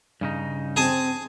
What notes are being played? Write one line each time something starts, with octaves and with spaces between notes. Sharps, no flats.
G2 C#3 D#4
C4 G#4 G#5 A5